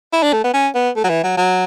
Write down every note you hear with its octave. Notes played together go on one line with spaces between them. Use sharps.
E4
D4
A3
B3
C#4
B3
A3
F#3
E3
F#3
F#3